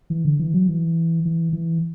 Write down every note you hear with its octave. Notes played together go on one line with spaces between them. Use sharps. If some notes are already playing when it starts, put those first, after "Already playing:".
E3
D3
E3
F#3
E3
E3
E3